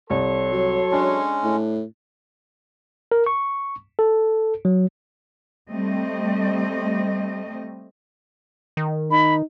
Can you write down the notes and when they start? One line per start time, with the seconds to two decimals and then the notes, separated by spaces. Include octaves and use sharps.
0.10 C2 A4 C#5 C6
0.52 F#3
0.92 G#3 C#4 D4
1.43 A2
3.12 A#4
3.26 C#6
3.99 A4
4.65 F#3
5.71 G3 A3 C4 D#5
8.77 D#3
9.11 D#4 B5